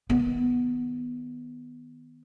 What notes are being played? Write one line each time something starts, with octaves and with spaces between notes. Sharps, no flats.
D#3 B3